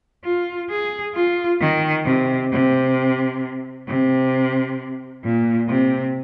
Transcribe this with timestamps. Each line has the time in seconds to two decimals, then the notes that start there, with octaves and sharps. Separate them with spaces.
0.24 F4
0.70 G#4
1.15 F4
1.61 D#3
2.05 C3
2.52 C3
3.88 C3
5.24 A#2
5.69 C3